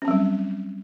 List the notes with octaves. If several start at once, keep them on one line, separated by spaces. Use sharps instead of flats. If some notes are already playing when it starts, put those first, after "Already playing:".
F#3 G3 C4 C#4